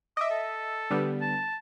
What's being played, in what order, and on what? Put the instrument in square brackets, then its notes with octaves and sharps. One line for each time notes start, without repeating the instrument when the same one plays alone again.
[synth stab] D#5 E5 [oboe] D6
[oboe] A4
[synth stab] D3 G3 B3
[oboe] A5